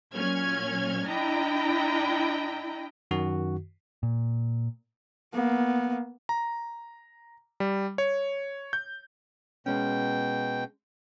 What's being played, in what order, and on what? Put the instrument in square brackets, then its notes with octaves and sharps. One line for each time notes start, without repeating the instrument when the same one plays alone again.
[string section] A#2 F#3 C#4 F6 G#6
D4 E4 D#5 G5 A#5
[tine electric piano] F#2 D#3 F#4
[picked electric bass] A#2
[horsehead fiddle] A#3 B3
[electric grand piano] A#5
G3
C#5
G6
[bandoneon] B2 G5 [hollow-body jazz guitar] G#3 C#4